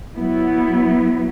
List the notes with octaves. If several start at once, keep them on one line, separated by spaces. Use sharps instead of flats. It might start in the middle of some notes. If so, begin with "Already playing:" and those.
F#3 B3 E4